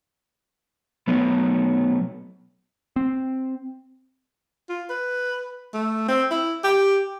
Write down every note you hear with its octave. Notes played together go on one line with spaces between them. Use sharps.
B2 F#3 A3 B3
C4
F4
B4
A3
C4
E4
G4